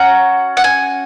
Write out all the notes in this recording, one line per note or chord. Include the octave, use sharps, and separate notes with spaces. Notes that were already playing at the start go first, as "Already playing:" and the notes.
Already playing: C#4 F#4 A#5
F#5
G#5